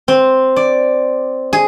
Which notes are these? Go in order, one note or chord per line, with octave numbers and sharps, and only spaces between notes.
C4
D5
G#4